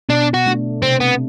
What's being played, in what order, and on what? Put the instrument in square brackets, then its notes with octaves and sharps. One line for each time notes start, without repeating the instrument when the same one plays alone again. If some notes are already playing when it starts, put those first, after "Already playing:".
[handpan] B2 [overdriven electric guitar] D4
[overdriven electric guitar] F#4
[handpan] A3 D4
[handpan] C3 [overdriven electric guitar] C4
[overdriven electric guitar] B3